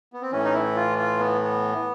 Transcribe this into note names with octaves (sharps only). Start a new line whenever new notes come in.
B3
C4
A2 E3 C#4
D#4
E4
F4
F4
B3
B3